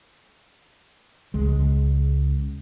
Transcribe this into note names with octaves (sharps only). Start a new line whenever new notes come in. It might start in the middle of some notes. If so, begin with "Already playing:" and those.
C#2 G#3